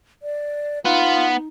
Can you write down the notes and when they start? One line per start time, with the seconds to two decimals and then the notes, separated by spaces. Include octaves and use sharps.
0.22 D5
0.85 B3 D#4 F4